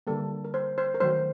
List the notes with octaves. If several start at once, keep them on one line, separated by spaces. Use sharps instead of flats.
D3 G3 A#3 A4
A#4
C5
C5
A#4
D#3 F#3 A3 C5